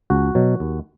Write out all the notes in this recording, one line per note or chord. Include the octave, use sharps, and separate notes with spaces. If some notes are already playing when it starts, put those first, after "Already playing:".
C#2 F#4
B2 F#3
D#2